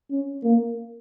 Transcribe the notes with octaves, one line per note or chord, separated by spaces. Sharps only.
C#4
A#3